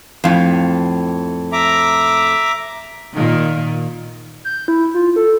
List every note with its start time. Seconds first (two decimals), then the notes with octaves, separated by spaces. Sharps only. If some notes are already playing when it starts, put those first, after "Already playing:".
0.24 F2 A2
1.52 E5 A#5 D6
3.13 A#2 D#3
4.45 G6
4.68 E4
4.94 F4
5.16 A4